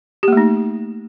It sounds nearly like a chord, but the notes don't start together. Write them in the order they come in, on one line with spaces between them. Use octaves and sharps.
G4 A#3 A3 D#4